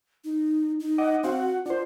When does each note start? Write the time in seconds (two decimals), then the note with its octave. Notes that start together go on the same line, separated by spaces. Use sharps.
0.24 D#4
0.80 D#4
0.98 D#5 F#5 D6
1.24 C4 F#4 F5 F#5
1.40 F#5
1.66 D4 F4 C5